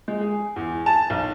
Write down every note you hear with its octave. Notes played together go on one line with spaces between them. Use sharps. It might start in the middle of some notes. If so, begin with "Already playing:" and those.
G#3
G#4
E2
A5
B1